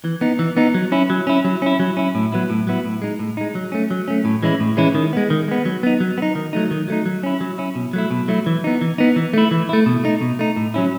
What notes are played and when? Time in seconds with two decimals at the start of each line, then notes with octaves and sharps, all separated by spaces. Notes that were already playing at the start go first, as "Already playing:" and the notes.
0.04 E3
0.21 B3 D#4
0.39 E3
0.57 B3 D#4
0.74 F#3
0.92 C#4 E4
1.10 F#3
1.27 C#4 E4
1.45 F#3
1.62 C#4 E4
1.80 F#3
1.97 C#4 E4
2.15 A2
2.32 F#3 B3 E4
2.50 A2
2.67 F#3 B3 E4
2.85 A2
3.02 G#3 D#4
3.19 A2
3.37 G#3 D#4
3.55 F#3
3.72 A3 C#4
3.91 F#3
4.08 A3 C#4
4.25 A2
4.43 E3 G#3 C#4 E4
4.60 A2
4.77 E3 G#3 C#4 E4
4.95 D#3
5.13 G#3 B3
5.30 D#3
5.48 G#3 B3
5.65 F#3
5.83 B3 D#4
6.00 F#3
6.18 B3
6.22 D#4
6.35 D#3
6.53 F#3 A3 D#4
6.71 D#3
6.88 F#3 A3 D#4
7.06 F#3
7.23 C#4 E4
7.41 F#3
7.58 C#4 E4
7.75 B2
7.93 F#3 A3 E4
8.11 B2
8.28 F#3 A3 E4
8.46 E3
8.64 B3 D#4
8.81 E3
8.98 B3 D#4
9.16 E3
9.33 A3 E4
9.51 E3
9.69 A3 E4
9.86 B2
10.04 A3 D#4
10.21 B2
10.39 A3 D#4
10.56 A2
10.74 F#3 C#4 E4